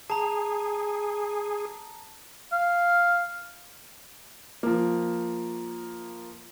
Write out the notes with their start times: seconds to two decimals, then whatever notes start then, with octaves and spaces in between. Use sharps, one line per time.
0.10 G#4 A5 A#5
2.52 F5
4.63 F3 A#3